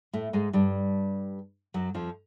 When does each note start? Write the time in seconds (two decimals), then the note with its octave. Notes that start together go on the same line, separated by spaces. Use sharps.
0.13 A2 A3
0.33 G#2 G#3
0.53 G2 G3
1.74 F#2 F#3
1.94 F2 F3